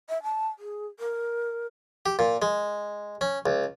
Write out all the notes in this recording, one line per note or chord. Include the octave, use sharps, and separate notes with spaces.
E5
A5
G#4
A#4
G4
A#2
G#3
C#4
C#2